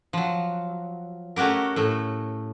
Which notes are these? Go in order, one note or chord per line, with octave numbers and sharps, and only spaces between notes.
F3 F#3
A3 C#4 F#4 G4 A#4
A2 A3